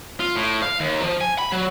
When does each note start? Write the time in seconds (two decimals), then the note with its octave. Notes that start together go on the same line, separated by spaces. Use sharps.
0.20 F4
0.36 A2
0.63 F5
0.80 D#2
1.02 F3
1.21 G#5
1.38 B5
1.52 F#3